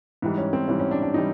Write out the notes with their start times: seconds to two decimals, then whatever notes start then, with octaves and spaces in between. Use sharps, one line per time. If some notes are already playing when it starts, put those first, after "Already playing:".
0.22 G#2 E3 G3
0.38 C#4
0.53 C4
0.68 G#2 E3 G3 C#4
0.80 C#4
0.91 D4
1.03 D4
1.14 E3 G3 D#4